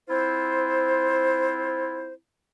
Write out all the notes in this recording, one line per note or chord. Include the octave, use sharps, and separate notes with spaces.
C4 E4 F4 C5